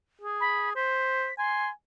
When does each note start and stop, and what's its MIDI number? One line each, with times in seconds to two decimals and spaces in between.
0.21 0.72 68
0.40 0.70 83
0.76 1.29 72
0.76 1.34 95
1.38 1.70 80
1.38 1.69 84